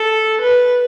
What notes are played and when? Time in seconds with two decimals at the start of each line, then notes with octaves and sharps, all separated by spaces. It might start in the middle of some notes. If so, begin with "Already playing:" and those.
Already playing: A4
0.41 B4